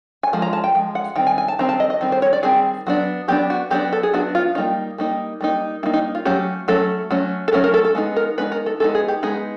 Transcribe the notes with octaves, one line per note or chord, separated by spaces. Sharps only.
G#5
F3 G#3
A#5
A5
G5
F3 G#3
F#5
D#3 G3 C4 G5
G#5
G#5
A5
D#3 G3 C4 A#5
A5
D#5
D#5
D#3 G3 C4
C5
C#5
D5
D#3 G3 C4 G#4
F#3 B3 D4
F#3 B3 D4 G4
F#4
F#3 B3 D4 G4
A4
G#4
F#3 B3 D4 F#4
F4
G3 A#3 D#4 F4
G3 A#3 D#4
G3 A#3 D#4
G3 A#3 D#4 E4
D#4
F4
F#3 A3 C#4 G4
F#3 A3 C#4 A4
F#3 A3 C#4
A4
F#3 A3 C#4 A#4
A#4
A4
A4
G#3 B3 D#4
A#4
G#3 B3 D#4 B4
A#4
A4
G#3 B3 D#4 A4
G#4
G4
G#3 B3 D#4 G#4